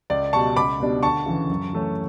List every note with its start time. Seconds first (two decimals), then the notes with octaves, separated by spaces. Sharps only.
0.10 C#2 D5
0.33 B2 G3 A5 C#6
0.56 C#2 B5 D6
0.80 B2 G3 B3 D4
1.03 D2 A5 C#6
1.26 C#3 E3
1.50 F#2
1.73 E3 A3 C#4